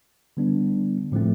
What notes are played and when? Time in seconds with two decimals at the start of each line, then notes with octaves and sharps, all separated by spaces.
0.37 D3 G3 B3 D4
1.12 A2 F3 A3 C4